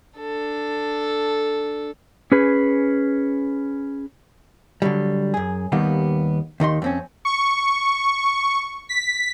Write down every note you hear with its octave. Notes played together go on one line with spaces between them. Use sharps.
D4 A4
C#4 G#4 B4
D3 F#3 G3
F#2 G#4
D#2 D#3 G3 A#3 B3
D#2 D#3 D#5 C6
F2 C4 C#4
C#6
B6